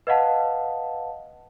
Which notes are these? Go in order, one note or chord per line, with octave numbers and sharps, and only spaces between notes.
B4 D#5 F5 F#5 A5